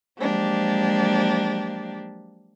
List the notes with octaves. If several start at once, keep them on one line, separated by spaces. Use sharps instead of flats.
F3 F#3 G#3 A#3 D4 G4